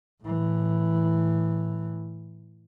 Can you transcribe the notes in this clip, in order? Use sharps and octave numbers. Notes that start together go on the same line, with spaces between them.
A2 E3